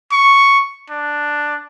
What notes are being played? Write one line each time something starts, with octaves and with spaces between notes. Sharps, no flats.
C#6
D4